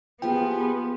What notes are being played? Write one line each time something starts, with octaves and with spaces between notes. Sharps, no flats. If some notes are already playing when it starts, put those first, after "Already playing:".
F3 B3 F4 G4 G#4 G5